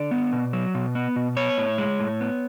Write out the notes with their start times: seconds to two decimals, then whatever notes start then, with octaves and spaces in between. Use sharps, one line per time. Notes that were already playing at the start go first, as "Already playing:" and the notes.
Already playing: D3 D5
0.11 B3
0.32 B2
0.53 F#3
0.75 B2
0.95 B3
1.16 B2
1.37 B3 C#5
1.58 A2
1.78 G#3
2.00 A2
2.21 B3